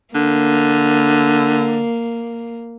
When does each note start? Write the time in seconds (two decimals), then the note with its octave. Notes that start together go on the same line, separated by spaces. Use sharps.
0.15 D3 A#3